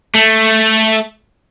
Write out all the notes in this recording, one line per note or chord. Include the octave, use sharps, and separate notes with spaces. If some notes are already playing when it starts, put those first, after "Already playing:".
A3